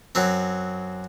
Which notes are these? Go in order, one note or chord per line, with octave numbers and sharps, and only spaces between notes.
F#2 F#3 C4